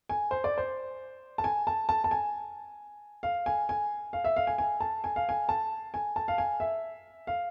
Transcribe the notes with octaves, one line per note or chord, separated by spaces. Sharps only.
G#5
C5
D5
C5
A5
G#5
A5
A5
A5
G#5
F5
G#5
G#5
F5
E5
F5
G#5
G#5
A5
G#5
F5
G#5
A5
G#5
A5
F5
G#5
E5
F5